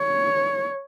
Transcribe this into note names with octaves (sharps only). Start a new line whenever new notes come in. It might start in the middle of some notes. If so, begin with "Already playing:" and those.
Already playing: C#5